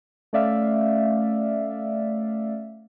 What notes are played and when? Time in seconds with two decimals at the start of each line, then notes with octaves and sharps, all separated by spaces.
0.33 A3 C#4 D5 E5 F5